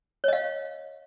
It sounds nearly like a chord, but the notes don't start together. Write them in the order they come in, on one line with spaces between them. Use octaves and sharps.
C#5 D#5 F5